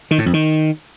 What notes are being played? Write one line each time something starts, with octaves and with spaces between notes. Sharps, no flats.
D#3
A2
F2
D#3